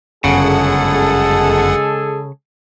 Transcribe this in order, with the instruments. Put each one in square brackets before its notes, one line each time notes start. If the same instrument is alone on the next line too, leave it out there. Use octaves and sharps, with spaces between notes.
[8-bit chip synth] G1 F#2 F#5 [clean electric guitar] C#3 [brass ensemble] G#3 G#4 A4